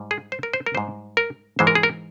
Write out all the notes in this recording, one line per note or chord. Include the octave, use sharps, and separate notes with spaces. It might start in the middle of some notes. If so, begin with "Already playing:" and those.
Already playing: G#2 G3
G#4
C5
A#4
C5
A#4
G#2 G3 C5
A#4
G#2 E3 G#3 C5
A#4
G#4
A#4